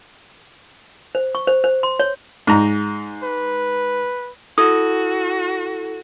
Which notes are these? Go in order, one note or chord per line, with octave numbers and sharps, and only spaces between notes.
C5
C#6
C5
C5
C6
C#5
G#2 A#5
B4
E4 F#4 A4 D#6 G#6